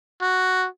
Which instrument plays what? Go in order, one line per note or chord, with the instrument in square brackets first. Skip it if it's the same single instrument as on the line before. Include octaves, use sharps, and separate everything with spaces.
[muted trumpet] F#4